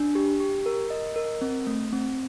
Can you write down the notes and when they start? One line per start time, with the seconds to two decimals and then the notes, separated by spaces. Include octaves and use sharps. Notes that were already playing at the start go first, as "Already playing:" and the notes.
Already playing: D4
0.15 G4
0.40 G4
0.66 A#4
0.90 D#5
1.16 A#4
1.41 C4
1.67 A3
1.92 C4